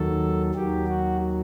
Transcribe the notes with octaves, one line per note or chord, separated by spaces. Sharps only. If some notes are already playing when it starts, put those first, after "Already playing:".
Already playing: D#2 D#3 F#3 A4
D#2 D#3 F#3 G4
F#4